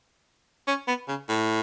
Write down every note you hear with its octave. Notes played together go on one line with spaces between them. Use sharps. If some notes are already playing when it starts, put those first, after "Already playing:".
C#4
B3
C#3
A2